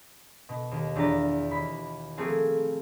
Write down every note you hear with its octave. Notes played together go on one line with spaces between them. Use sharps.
B2
D#2
E2 D4 F4 A#5 A6
D#2 B5
F3 A3 A#3 C4 F4 G#4